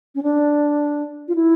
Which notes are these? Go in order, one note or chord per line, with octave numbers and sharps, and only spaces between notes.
C#4
D4
F4
E4